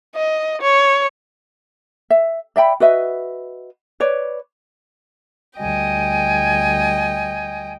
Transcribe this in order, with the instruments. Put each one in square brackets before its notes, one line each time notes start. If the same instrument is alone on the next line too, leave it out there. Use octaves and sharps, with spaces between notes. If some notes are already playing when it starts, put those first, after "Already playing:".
[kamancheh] D#5
C#5
[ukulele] E5
D5 E5 G5 B5
F#4 B4 D#5 E5
B4 C#5 D5
[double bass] D2 G3 [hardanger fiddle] D#5 G5 [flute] G#5